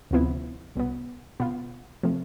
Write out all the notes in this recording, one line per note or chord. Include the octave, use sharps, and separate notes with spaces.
D2 C3 F3 B3 E4
C2 B2 B3
B2 B3 F4
C3 F3 A3